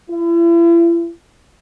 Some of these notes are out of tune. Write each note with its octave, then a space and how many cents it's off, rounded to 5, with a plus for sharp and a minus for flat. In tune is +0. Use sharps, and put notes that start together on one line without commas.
E4 +40